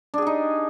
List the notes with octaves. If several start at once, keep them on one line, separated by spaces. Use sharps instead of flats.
D4 D#4 G4 G#4